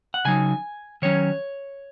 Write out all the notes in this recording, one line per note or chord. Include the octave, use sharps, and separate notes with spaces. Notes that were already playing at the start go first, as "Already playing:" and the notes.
F#5
C#3 F#3 D#4 G#5
D#3 F#3 C#4 C#5